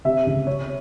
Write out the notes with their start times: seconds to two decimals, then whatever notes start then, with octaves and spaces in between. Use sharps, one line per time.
0.05 C3 E5
0.26 C#2
0.47 C3 C#5